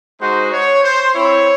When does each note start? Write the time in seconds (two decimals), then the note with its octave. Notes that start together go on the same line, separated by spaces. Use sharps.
0.21 G#3 D#4 F#4 C5
0.52 C#5
0.83 C5
1.14 C4 E4 C#5